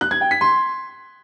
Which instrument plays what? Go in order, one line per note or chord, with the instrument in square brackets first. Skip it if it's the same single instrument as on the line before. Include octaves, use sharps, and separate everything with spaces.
[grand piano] F#6
G#6
G5
B6
C6